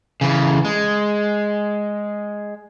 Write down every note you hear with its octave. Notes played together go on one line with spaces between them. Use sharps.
C#3 E3
G#3